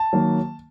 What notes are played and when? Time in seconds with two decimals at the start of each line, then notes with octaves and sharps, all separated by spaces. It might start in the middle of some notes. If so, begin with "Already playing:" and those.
Already playing: A5
0.13 D#3 F#3 A#3